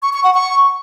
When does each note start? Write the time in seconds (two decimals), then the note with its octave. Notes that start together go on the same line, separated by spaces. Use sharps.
0.03 C#6
0.13 C#6
0.24 F#5
0.35 C#6